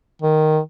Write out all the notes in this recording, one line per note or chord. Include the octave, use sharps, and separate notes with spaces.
D#3